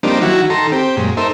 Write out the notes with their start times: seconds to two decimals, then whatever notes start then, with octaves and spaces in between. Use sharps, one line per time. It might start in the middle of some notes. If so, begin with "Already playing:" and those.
0.03 F3 G3 A#3 C4 D4 D#4
0.22 D#3 F#3 E4 F#4
0.50 D#3 A4 A#5 C6
0.72 C4 G4
0.97 F#2 A#2 G#3
1.17 D#4 A4 A#4 C5 E5